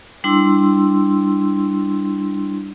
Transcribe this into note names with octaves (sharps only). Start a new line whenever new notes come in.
G3 D4 E4 C6 E6